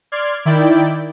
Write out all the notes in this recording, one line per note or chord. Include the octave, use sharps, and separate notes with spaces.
D5 C6 F6 G#6
D#3 E4 D5 G5